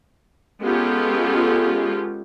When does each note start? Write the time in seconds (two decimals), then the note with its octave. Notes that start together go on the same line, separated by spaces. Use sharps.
0.61 G#3 B3 C#4 F4 G4 A4